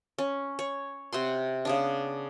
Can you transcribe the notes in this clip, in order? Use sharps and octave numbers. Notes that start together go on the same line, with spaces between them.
C#4
C#5
C3 F#5 C6
C#3 B3 D4